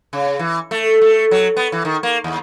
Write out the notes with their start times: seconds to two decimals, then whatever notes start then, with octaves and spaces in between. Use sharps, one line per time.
0.13 C#3
0.39 E3
0.71 A3
1.02 A3
1.31 F#3
1.57 B3
1.72 E3
1.85 D#3
2.03 A#3
2.24 D#2